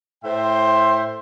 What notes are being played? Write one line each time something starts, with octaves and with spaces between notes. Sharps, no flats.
A2 C5 E5 G5 C6